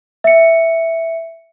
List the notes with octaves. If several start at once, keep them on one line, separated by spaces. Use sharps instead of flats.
E5 C#7